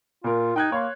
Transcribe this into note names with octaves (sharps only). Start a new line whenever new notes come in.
A#2 F4 A#4
D#4 G5 F#6 G#6
A#3 C#5 C6